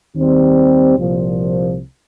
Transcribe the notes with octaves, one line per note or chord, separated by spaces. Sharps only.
D#2 D#3 G3 C4
C2 A#2 F3